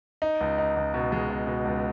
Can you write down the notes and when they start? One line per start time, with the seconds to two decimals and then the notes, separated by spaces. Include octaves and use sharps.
0.22 D#4
0.41 C#2
0.58 D#4
0.77 C#2
0.94 B2
1.12 G#3
1.30 B2
1.47 B2
1.65 C#2